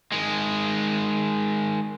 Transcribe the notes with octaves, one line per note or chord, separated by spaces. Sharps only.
D#3 G#3